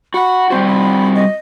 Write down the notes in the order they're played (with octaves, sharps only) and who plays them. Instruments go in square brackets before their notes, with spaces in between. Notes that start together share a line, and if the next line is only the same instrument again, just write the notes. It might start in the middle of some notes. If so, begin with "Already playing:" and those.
[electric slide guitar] F#4 F#5 [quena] B5
[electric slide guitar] G3 C4 F#4 [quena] C5
[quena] B5
D#5